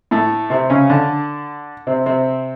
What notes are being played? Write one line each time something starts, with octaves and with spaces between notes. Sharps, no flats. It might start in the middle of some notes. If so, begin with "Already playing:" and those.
A2 A3
C3 C4
C#3 C#4
D3 D4
C3 C4
C3 C4